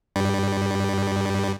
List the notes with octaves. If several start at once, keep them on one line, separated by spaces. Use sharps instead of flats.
G2 G3